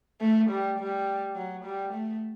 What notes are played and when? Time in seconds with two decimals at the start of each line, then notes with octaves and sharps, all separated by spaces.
0.21 A3
0.50 G3
0.79 G3
1.36 F#3
1.65 G3
1.94 A3